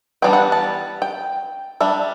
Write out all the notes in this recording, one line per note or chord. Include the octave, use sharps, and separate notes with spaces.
E3 G3 B3 D4 G5
F#5
A5
G5
G3 D4 E5